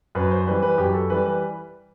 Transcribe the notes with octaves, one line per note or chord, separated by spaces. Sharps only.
F#2 B4
C5
E3 G3 B4
B4
F#2 G4
A4
E3 G3 B4
B4